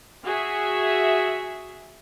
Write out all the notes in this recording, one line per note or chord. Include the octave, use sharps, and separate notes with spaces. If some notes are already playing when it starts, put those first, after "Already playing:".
F#4 G#4 E5